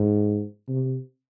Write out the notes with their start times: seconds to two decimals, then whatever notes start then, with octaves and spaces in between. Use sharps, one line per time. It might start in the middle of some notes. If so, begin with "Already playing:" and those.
Already playing: G#2
0.68 C3